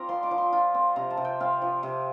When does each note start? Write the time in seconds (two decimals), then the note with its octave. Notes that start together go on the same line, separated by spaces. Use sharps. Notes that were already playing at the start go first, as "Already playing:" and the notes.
Already playing: C4 F4 D5 F5 G5 A#5
0.09 F3 C6
0.23 D6
0.31 F3
0.38 C6
0.52 F4
0.75 C4
0.96 C3 A#5
1.10 A5
1.17 C3
1.25 G5
1.40 C4 F5
1.62 F3
1.83 C3